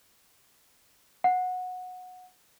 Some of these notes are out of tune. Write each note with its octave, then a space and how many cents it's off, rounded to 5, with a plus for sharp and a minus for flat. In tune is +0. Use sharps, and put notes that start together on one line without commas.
F#5 -15